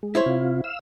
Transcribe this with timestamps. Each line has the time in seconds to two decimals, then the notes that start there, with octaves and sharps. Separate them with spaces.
0.03 G#3
0.15 E4 C5 C#5
0.26 C3 F4
0.64 F5 E6